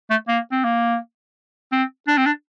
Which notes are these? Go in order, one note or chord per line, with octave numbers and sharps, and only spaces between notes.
A3
A#3
C4
A#3
C4
D4
C4
D4